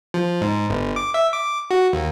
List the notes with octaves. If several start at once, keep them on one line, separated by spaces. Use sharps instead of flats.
F3
G#2
G1
D6
E5
D6
F#4
D#2